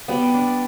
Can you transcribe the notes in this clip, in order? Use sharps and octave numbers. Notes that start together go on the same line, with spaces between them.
G3 B3
D4